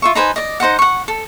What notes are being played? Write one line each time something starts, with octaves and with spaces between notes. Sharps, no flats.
F4 E5 C#6
D#4 B4 C5 G#5
D5 D#5
D#4 C5 D#5 F#5
F#5 C#6
A4